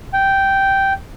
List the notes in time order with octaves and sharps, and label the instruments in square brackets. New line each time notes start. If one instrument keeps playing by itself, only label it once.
[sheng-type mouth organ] G5